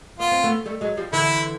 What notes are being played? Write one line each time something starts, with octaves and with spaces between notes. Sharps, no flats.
B3 F4
C4
A3 B3
G3 A3
F#3 G#3
F3 G3
D3 E3 E4